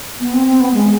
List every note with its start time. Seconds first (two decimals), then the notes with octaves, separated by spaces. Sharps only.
0.20 B3
0.33 C4
0.47 C4
0.60 B3
0.74 G#3